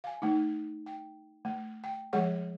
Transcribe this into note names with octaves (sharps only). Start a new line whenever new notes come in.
F5 G#5
A3 D#4
G5
A3
G5
F3 G#3 G#4 C#5 F#5 C#6